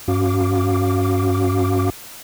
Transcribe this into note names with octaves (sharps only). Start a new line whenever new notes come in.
G2 C#4 F#4 F5 D6